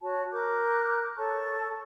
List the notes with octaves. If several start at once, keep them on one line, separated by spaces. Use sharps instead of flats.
F#4 C#5 A5
A#4 D6 F#6 G6
A4 C#5 A5 C#6